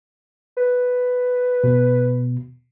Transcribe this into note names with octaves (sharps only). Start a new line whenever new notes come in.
B4
B2